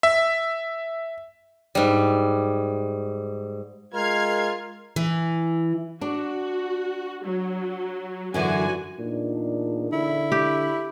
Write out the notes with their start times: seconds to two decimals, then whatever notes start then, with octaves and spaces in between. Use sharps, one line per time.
0.03 E5
1.75 G#2 G3
3.94 G#3 F4 A#4 F6 G#6 C7
4.96 E3
6.01 D4 F#4
7.24 F#3
8.34 F#2 D3 E3 F#4 G#5
8.99 E2 A#2 D4 D#4
9.93 D3 E4
10.32 G4